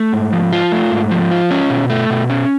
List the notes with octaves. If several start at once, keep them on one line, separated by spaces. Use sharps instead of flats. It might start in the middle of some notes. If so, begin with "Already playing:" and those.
Already playing: A3
G#2
F3
F4
A3
G#2
F3
F4
C#4
B2
A3
B2
C#4